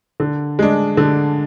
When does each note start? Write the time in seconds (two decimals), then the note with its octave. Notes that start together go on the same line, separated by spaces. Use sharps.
0.20 D3
0.59 G#3 D4
0.97 D3